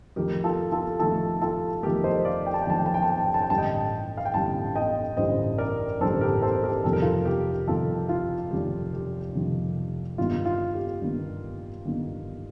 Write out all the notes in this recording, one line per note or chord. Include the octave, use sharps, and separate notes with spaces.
F2 D#3 A3 G4 A#4
F4 A4
F4 A4
F2 D#3 A3 F4 A4
F4 A4
F2 D#3 A3 G4 A#4
C5 D#5
D5 F5
G5
A5
G5
F2 D#3 A3 A5
G5
A5
G5
A5
G5
A5
G5
A5
G5
A1 G2 D3 G3 A5
D#5 G5
F5
G5
A1 G2 D3 G3 F5 A5
D#5 G5
A1 G2 D3 G3 C5 D#5
A#4 D5
A1 G2 D3 G3 A4 C5
G4 A#4
A4 C5
G4 A#4
F1 F2 C3 D#3 G3 A4
A#4
F4 A4
G4
F1 F2 C3 D#3 G3 F4 A4
F4
F1 F2 C3 D#3 G3 G4
G4
F1 F2 C3 D#3 G3
G1 G2 D#3 A#3 F4
F4
G4
G1 G2 D#3 A#3
G1 G2 D#3 A#3